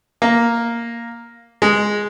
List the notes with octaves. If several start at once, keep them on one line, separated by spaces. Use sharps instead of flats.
A#3
G#3